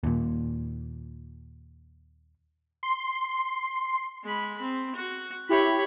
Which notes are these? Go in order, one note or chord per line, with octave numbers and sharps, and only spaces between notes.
D#2 A#2
C6
G#3 B5
C4
F#4
E4 G4 C#5 B5